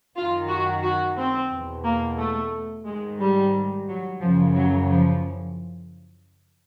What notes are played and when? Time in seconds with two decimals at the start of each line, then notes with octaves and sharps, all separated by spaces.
0.15 F#2 D#3 F4
0.49 F#4
0.83 F#4
1.17 C4
1.51 E2 B2
1.84 A#3
2.18 A3
2.86 G#2 D#3 G#3
3.20 G3
3.88 F#3
4.21 F#2 C#3 E3 F3
4.55 F#3
4.88 F3